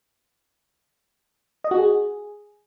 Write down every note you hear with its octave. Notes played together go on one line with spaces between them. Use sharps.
D#5
F#4
G#4